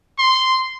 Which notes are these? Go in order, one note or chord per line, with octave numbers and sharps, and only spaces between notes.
C6